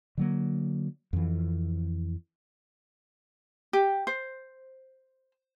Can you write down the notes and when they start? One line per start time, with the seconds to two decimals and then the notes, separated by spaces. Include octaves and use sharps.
0.18 D3 F#3 A#3
1.13 F2 E3
3.73 G4
4.07 C5